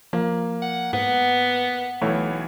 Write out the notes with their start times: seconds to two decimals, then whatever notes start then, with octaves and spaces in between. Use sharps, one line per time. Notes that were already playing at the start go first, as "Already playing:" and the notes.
0.13 F3 A#3 F5
0.62 F#5
0.93 G#2 B3 F#5
2.02 B1 E3 A3 C#5